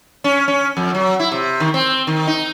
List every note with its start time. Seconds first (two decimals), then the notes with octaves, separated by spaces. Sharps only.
0.24 C#4
0.48 C#4
0.77 F2
0.95 F#3
1.20 E4
1.32 C3
1.60 D#3
1.74 C4
2.07 D#3
2.27 D#4